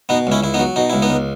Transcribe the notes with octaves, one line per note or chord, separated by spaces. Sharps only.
B2 B3 D#4
C#2 C#4 E4
C#2 E4
B3 D#4
F#3
B2 D#4
C#2 E4
B3 D#4
C#2